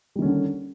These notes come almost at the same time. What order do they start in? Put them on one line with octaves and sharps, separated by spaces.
G3 D#3 C#4 D3